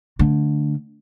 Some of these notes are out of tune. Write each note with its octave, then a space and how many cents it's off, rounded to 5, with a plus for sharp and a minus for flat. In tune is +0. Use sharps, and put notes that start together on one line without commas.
D3 +0 A3 +0